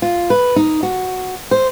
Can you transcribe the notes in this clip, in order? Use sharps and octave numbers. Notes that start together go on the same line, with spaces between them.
F4
B4
D#4
F#4
C5